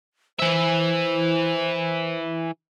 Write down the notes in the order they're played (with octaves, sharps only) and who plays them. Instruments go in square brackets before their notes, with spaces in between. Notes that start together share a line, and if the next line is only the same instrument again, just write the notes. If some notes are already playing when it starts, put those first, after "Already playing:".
[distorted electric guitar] E3 E5 [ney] C5